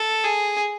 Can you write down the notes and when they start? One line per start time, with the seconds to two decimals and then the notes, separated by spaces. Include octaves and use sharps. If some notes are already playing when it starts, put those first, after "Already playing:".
Already playing: A4
0.24 G#4